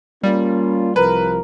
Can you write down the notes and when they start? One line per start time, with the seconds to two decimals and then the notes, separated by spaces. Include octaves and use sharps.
0.23 G3 A#3 C#4 F4
0.96 C2 F3 A#4 B4